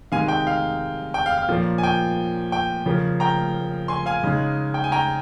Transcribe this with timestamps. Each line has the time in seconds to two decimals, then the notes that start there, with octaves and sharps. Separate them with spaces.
0.12 C3 D#3 G#3 D#4 F5 G#5
0.28 G5
0.47 F5
1.14 G5
1.26 F5
1.38 F5
1.48 A#2 F3 A#3 C#4
1.78 G#5
1.83 G5
2.52 G5
2.86 C#3 F3 A#3 C#4
3.20 G5 A#5
3.88 G#5 C6
4.06 F5 G#5
4.23 C#3 G#3 D#4
4.74 G5
4.84 G#5
4.92 G5 A#5